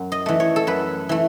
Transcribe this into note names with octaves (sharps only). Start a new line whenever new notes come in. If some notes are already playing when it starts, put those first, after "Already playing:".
Already playing: F#2
D#5
E3 A3
C#5
A4
F#2 B4
E3 A3